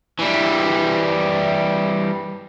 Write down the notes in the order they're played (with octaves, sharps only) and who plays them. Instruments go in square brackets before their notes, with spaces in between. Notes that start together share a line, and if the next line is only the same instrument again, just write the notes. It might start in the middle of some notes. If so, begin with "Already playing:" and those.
[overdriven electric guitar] E3 G3